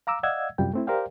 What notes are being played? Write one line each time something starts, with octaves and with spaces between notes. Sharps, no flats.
F5 A#5 D6 E6
D5 D#5 F5 F#5 E6 G#6
F#2 C3 G3 F4 G5
A3 C4 E4
G4 A#4 C5 D5 F5 G5